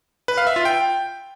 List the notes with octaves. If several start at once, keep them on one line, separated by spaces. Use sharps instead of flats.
B4
F5
E5
F4
G5